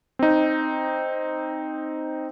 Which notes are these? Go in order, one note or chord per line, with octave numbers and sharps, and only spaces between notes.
C4 D#4